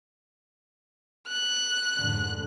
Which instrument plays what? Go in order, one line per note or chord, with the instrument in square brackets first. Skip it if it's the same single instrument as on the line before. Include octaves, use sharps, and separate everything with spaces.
[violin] F#6
[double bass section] F1 G#2 D3